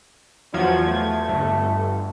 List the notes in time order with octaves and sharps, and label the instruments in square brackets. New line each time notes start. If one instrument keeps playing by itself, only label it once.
[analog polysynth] E2 F3 G#6 [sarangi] F#3
[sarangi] A3
[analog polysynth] G1